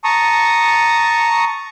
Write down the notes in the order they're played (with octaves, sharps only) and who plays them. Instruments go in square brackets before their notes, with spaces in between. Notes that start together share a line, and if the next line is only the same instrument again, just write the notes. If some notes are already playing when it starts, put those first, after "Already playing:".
[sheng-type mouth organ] A5 A#5 C#6 D#6